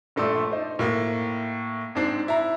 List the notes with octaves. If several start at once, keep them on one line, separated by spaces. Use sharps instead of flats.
A#1 G2 A3 D5 C6 E6
D#4 C5
A2 A#3
G#2 C4 D4 C7
E4 A#5